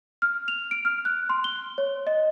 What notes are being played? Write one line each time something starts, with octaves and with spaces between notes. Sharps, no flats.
F6
F7
D7
F6
F#6
C6
G7
C#5
D#5